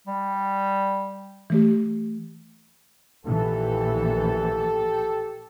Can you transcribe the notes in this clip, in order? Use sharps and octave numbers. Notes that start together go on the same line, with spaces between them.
G3
E3 A3 G4
A#1 E3 G4 A4